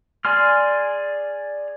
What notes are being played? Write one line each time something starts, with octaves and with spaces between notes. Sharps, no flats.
G#4 D5 G#5 C6 F6